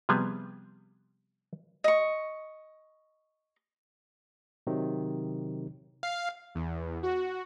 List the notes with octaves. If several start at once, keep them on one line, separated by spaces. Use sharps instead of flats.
C3 F3 G3 B3 G#4 G#5
D#5 C#6
C3 D#3 F#3
F5
E2
F#4